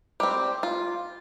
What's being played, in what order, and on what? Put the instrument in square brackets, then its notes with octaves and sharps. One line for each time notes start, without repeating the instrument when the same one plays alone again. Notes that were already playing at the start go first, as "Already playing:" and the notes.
[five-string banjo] G3 C4 G4
F4